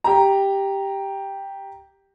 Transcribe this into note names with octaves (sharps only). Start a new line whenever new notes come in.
G4 A#5